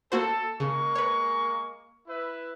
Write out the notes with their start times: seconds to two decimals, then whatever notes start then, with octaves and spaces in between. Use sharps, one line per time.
0.12 A#3 F#4 A4 C5
0.60 C#3 G#3 A#3 C#6
0.95 B4 C#5
2.07 E4 B4 E5